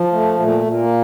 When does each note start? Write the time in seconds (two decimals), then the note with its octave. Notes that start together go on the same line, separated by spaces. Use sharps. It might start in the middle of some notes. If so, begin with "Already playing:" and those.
Already playing: F3
0.13 A3
0.40 A#2 A3
0.66 A#2
0.80 A#3